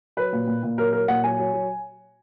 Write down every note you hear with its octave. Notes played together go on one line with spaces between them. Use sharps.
F#3 B4
A#2
A#2
A#2
F#3 A#4
F#3 A#4
A#2 F#5
F#3 G#5
F#3
F#3